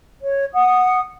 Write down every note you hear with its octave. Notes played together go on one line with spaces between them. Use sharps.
C#5
F#5 D#6